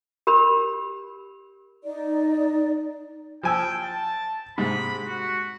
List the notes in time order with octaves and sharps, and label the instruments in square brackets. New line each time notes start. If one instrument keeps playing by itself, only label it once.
[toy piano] G4 A#4 B5
[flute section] D#4 D5
[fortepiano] F3 G#5 E6 [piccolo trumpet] G5
[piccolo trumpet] A5
[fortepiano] G#2 C3 [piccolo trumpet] B5
[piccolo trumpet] F#4